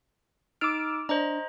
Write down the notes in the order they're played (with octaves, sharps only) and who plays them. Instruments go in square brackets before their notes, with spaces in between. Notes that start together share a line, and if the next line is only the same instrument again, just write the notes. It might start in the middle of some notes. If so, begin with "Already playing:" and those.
[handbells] D#4 D7 [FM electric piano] D6 E6 F6
[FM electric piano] D4 [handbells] C5 D#5 A#5